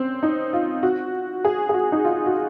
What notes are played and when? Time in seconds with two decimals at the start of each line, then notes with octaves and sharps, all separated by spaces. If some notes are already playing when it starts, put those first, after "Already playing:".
Already playing: C4 C#4
0.23 D#4
0.53 F4
0.83 F#4
1.45 G#4
1.69 G#4
1.74 F#4
1.92 D#4
2.05 F4
2.26 F#4